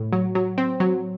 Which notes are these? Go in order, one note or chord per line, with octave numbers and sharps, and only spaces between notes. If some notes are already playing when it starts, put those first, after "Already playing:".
Already playing: A2
F#3
F#3
C4
F#3